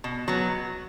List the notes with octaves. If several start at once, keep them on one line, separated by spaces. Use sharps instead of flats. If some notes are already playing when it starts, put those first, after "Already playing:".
B2
F#3 B3